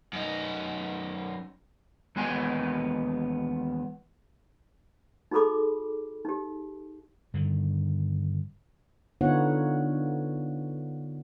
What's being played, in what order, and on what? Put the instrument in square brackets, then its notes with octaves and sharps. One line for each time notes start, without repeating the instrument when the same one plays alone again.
[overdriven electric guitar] F#2 D#4
[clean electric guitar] D#2 E3 G#3 B3 G#5 C6
[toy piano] D#4 F#4 G#4 A4 B5 D6
D#4 G4
[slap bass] G2 D3 D#3
[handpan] D3 B3 D#4 F4 C#5 F#5